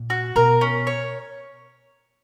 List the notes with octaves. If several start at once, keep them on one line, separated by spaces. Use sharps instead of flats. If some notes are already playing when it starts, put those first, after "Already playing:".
Already playing: A#2
F#4
B2 A#4
C#4
C#5